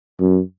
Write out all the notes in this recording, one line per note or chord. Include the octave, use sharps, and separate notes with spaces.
F#2